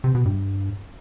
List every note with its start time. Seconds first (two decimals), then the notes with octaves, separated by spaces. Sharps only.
0.04 C3
0.15 B2
0.26 G2